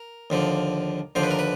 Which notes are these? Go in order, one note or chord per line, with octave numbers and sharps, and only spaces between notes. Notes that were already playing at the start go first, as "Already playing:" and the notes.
Already playing: A#4
D#2 D3 F3
D#2 D3 F3 C5
B4
A#4
B4